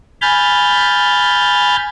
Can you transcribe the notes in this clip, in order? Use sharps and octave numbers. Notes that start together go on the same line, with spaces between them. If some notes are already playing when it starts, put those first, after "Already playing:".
G#5 B5 F6 G6 A6